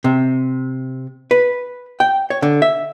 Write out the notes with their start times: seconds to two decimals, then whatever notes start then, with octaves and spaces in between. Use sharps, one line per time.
0.04 C3
1.31 B4
2.00 G5
2.30 C#5
2.42 D3
2.62 E5